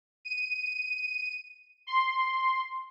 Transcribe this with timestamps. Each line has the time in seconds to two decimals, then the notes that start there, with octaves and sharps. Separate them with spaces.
0.25 D#7
1.87 C6